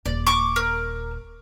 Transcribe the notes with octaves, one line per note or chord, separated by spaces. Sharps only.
D#1 D5
C#6 D6
A#4